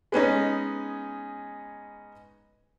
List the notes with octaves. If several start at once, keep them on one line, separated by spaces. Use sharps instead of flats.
G#3 B3 C#4 D#4